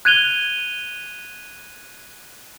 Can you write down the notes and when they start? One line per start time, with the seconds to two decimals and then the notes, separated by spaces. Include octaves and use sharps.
0.05 F#6 G#6 D#7 F7 G7